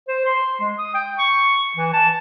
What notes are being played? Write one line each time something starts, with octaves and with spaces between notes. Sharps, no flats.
C5
C6
G#3
D#6
G5
C#6
E3
A5